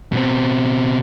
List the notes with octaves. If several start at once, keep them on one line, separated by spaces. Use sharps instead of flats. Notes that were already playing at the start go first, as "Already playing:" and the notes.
B2 C4